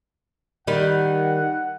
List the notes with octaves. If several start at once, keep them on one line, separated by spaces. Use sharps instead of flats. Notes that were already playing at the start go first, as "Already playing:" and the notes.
D#3 G3 F#5